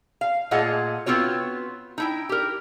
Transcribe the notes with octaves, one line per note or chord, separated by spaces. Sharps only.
F5
A#2 A3 F4 G#4 D#5 F#5
B3 C4 F4 F#4 C#5
D#4 E4 G5
G4 A#4